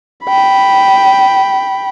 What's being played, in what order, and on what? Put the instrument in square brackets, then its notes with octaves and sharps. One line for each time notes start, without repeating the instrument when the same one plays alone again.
[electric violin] G5 B5